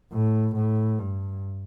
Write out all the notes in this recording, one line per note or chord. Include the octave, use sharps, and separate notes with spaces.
A2
A2
G2